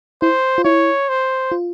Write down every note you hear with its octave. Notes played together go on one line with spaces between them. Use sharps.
E4 C5
F4
E4 C#5
C5
F4